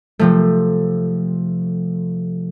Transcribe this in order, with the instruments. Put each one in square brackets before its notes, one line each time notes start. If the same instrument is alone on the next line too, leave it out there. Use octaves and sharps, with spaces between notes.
[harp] C3 F3 A3